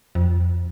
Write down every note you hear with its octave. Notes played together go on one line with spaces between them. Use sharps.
F2